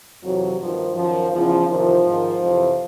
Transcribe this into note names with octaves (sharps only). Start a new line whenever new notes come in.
F2 C3 E3 F#3
G2 D#3 F3
F#2 D#3 F3
E2 C#3 E3 F3
E2 C3 D#3 F3
G#2 D#3
F2 C3 E3